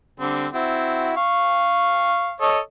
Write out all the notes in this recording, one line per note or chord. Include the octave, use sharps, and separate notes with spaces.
D3 G3 C4
C4 E4 F#4
F5 C#6
A4 C#5 D#5